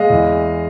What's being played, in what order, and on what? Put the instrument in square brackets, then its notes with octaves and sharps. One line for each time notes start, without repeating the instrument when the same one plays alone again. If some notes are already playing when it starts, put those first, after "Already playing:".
Already playing: [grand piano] G#3 D#5 F5
E2